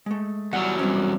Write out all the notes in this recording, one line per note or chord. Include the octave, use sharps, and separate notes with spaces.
G#3 A3
E2 F#3 G3 F#5
G3 C4 C#4